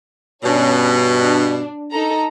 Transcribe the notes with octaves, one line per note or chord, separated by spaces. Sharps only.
G2 B2 C#4 D4 C#5
D4
D#4 A4 A#5